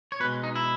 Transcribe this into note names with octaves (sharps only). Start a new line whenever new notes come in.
C#5
B2 G#3 B4
D#4
E4